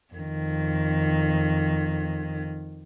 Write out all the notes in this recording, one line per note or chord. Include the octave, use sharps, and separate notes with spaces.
F2 D#3